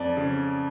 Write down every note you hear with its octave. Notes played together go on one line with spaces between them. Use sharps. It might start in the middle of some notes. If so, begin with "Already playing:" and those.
Already playing: F2 D5
C#3